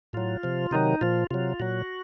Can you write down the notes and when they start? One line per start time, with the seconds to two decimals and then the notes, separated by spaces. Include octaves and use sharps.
0.13 A2 F#3 F4
0.43 C3 F3
0.71 C3 D#3 F#3 D#4
1.01 A#2 F3 F4
1.31 C3 F#3 F4
1.59 A#2 F#3 F#4